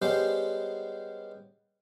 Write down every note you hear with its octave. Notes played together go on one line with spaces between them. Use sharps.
G3 G#3 B3 C#4 G4 C5